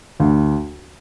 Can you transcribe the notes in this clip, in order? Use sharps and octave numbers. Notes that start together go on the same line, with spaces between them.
D2